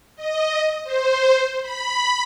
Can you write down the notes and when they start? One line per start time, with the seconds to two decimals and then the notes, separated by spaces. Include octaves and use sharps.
0.16 D#5
0.84 C5
1.61 B5